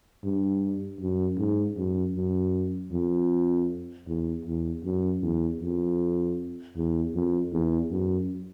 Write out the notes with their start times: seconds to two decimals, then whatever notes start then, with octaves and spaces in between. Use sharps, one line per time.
0.24 G2
1.01 F#2
1.39 G#2
1.77 F#2
2.15 F#2
2.92 F2
4.08 E2
4.45 E2
4.84 F#2
5.23 E2
5.61 F2
6.76 E2
7.15 F2
7.52 E2
7.91 F#2